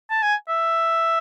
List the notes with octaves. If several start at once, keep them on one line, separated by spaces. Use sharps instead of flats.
A5
G#5
E5